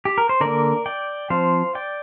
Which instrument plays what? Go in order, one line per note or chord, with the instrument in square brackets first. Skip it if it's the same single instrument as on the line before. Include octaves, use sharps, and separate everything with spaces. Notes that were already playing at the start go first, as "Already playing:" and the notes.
[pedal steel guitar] G4
A#4
C5
D3 A#3 A#4 D5
D5 G5
F3 C4 C5 F5
D5 G5